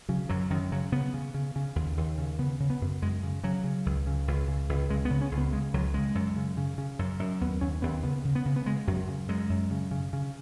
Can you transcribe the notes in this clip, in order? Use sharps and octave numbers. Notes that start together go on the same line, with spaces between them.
C#3 F#3
F#2 F#3
F#2 D#3
C#3 F#3
C#3 B3
C#3
C#3
C#3
D#2
D#2
C#3
C#3 B3
C#3
B3
F#2
F#2 G#3
C#3
C#3 F#3
C#3
C#2
C#3
C#2
C#3
C#2
C#3 G#3
B3
C#3
C#4
C#2
B3
C#3 G#3
C#2 F#3
C#3 G#3
F#2
C#3
C#3
C#3
F#2
F#2
D#2 B3
D#2 C#4
D#2 B3
C#3 B3
C#3
B3
C#3
B3
C#3 G#3
F#2 F#3
C#3
F#2 G#3
F#2
C#3
C#3
C#3